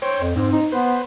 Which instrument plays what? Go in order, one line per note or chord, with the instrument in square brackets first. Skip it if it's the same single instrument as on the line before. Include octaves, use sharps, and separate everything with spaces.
[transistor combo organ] C5 C#5 G5
[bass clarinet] F2
[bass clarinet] G#2 [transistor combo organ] C4
[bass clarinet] D#4
[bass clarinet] B3 [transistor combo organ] B4 C5